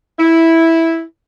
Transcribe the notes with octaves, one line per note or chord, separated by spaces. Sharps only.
E4